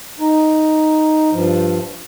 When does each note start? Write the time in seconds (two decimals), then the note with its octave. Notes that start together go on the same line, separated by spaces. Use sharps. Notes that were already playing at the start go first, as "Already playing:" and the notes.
0.20 D#4
1.32 G2 F3